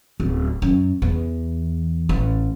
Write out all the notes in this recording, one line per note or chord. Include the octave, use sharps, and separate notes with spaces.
D1
F#2
E2
A1